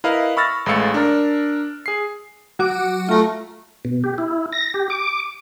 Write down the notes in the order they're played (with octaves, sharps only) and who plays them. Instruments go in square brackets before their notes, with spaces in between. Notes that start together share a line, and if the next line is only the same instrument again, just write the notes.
[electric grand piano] E4 A#4 B4 D#5 F5
B5 C#6 E6 F6 A6 A#6
A1 G#3 A3 F5 E6 C#7
D4 A#4
G#4 C7
[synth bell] F#3 F#4 D6
[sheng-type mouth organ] A3 [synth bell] F4 A#5
[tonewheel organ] B2
G4
E4
A#6
G4
D6